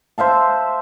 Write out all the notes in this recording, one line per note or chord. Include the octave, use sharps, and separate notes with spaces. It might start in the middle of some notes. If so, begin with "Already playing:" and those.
C5 E5 F5 A5